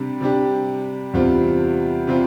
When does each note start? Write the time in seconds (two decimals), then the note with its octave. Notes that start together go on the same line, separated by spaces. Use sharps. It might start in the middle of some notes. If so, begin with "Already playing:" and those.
Already playing: C3 G3 D4 G4
0.20 C3 G3 D4 G4
1.13 E2 C3 G3 C4 F4
2.07 C3 G3 C4 F4